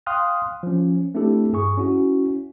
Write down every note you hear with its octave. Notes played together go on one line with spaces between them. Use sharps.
F5 G5 C6 D#6 F6 F#6
F3 C#4
A3 C4 D4 E4 G4 A4
G2 G#4 C#6
C#4 E4 F#4